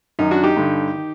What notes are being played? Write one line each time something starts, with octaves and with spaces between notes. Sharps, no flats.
F#2 D#3 D#4
D4 F#4
D#4 G4
G2 D3
D#3